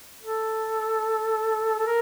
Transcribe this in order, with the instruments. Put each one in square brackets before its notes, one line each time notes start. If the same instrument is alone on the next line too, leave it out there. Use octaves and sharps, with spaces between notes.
[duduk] A4
A4
A#4